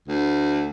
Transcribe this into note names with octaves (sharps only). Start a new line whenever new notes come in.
D2